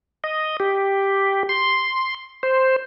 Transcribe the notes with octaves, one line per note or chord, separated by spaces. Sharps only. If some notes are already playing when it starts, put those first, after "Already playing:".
D#5
G4
C6
C5